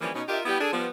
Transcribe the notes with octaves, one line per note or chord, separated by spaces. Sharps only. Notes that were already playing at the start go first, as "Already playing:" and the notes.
D3 E3 F3 G3 A#3 C#4
B2 C#4 D#4
D4 F4 G4 A#4 D#5 E5
B3 E4 G4
D4 G#4 A4
F3 G3 B3